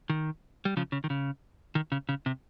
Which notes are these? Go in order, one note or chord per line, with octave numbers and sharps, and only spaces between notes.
D#3
G3
C#3 F3
C#3
D#3
C#3
D#3
C#3
C#3
C3